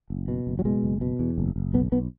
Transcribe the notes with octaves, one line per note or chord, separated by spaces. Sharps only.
F#1
B2
F#1
F#3
B2 G#3
F#1
B2
E2
F#1
F#1
B1 B3
B1 B3